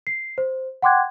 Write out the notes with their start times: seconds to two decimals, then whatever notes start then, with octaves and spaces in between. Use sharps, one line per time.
0.07 C7
0.38 C5
0.82 F#5 G5 C6 D6 F#6 G#6